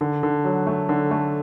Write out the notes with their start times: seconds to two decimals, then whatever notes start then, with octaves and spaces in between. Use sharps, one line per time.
0.01 D3
0.23 D3
0.45 F#3
0.67 A3
0.89 D3
1.11 A3